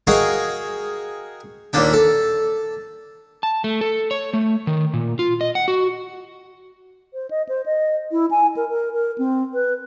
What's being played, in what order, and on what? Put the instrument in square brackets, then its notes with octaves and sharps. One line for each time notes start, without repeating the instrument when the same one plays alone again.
[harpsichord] F#4 G#4 A#4 D#5 F5 G5
D#2 A#2 A#3 D4 G5
A4
[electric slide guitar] A5
A3
A4
C#5
A3
D#3
A#2
F4
D#5
F#5
F#4
[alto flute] C5
D#5
C5
D#5
E4
G#5
A#4
A#4
A#4
C4
B4